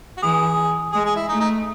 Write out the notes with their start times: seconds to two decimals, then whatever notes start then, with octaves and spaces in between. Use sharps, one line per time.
0.17 F#4
0.22 E3 G#4
0.92 G#3 G#4
1.05 G#4
1.16 E4
1.29 A3 D#4
1.40 D#4